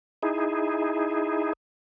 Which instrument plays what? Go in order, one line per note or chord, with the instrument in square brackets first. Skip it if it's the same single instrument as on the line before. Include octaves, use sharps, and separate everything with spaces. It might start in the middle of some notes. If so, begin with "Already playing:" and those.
[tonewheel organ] D#4 E4 G#4